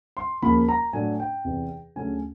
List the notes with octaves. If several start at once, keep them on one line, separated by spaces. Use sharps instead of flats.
C6
D#2 C#3 F3 A#3 B5
A#5
A2 F#3 A3 D4 G#5
G5
E2 C3 E3
D2 C#3 F#3 A3 C#4 G#5